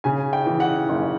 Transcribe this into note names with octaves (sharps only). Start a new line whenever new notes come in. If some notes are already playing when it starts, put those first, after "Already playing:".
C#3 G#5
G5
E3
F#5
F#1